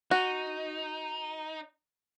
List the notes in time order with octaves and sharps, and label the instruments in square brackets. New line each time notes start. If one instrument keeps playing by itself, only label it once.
[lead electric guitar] D#4 [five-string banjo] F#4